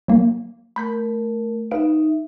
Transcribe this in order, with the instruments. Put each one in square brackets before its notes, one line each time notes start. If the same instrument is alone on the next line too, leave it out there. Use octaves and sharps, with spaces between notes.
[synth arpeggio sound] F#3 A#3
[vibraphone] A3 A#4 [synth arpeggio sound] B5 G6 B6
[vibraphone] D#4 E5 [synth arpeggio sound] B4 F5 D7